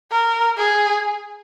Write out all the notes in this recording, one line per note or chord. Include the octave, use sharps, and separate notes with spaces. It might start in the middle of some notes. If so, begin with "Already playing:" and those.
A#4
G#4